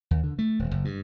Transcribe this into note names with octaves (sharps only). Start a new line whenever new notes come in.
D#2
D3
A3
D#1
F#1
G2